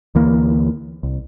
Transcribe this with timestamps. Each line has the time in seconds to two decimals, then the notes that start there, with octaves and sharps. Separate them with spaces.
0.15 D2 E3 A#3
1.03 C2